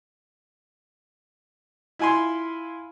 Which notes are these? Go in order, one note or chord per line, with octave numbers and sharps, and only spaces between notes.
E4 F4 G#5 B5 C6